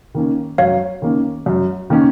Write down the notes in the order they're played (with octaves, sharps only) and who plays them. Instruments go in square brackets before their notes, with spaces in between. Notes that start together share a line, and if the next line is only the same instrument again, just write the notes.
[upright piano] D#3 A#3 C#4
[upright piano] F#2 [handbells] C#5 F5
[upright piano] D#3 A#3 C#4
F#2
D#3 A#3 C#4